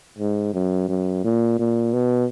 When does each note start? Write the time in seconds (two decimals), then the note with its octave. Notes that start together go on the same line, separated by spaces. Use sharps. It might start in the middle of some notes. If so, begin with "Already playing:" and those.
0.19 G#2
0.54 F#2
0.88 F#2
1.24 A#2
1.59 A#2
1.94 B2